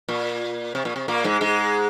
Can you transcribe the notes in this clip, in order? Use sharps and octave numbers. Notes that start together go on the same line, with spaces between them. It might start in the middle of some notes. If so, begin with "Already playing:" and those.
A#2
C3
A#2
C3
A#2 A#3
G#2 G#3
G#2 G#3